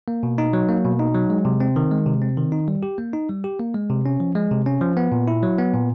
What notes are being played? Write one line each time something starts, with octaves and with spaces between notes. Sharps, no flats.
A#3
B2
D#4
F#3
A#3
B2
D#4
F#3
G#3
C3
C4
D#3
G#3
C3
C4
D#3
D#4
G3
G4
A#3
D#4
G3
G4
A#3
G#3
C3
C#4
F3
G#3
C3
C#4
F3
B3
A#2
E4
F#3
B3
A#2